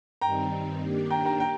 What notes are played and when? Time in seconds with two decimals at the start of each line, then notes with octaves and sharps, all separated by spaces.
0.21 G2 D#3 G3 C4 D#4 G5 A#5
0.81 D#3 A#3 D4 G4
1.10 G5 A#5
1.26 G5 A#5
1.40 G5 A#5